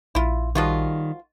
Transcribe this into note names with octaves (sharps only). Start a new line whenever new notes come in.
A#1 E4 F4
D#3 F3 G3 F4 F#4